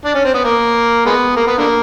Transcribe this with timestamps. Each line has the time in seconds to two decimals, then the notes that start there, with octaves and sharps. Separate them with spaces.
0.05 D4
0.14 C#4
0.24 C4
0.34 B3
0.44 A#3
1.05 G#3 B3
1.36 A#3
1.47 B3
1.58 D3 A#3